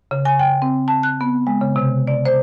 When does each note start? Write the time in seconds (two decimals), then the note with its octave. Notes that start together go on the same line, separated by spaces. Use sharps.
0.11 C#3
0.25 G#5
0.39 G5
0.62 C4
0.88 A5
1.03 F#6
1.21 B3
1.47 G#3
1.61 C#3
1.76 C3
2.07 D5
2.25 C5